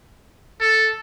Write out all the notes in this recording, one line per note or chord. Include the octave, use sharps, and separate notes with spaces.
A4